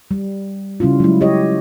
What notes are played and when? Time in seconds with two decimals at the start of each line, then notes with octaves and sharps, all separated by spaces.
0.11 G3
0.80 C#3 G3 C#4 E4 F4
1.00 F#3 G#3 E4
1.21 E4 G4 C#5 D#5